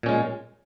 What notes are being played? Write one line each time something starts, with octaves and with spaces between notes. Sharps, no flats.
A#2 G#3 C#4